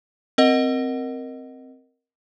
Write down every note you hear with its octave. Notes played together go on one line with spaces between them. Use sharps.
C4 A#4 D#5 F#5